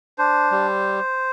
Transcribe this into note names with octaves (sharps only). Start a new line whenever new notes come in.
D4 C5
G3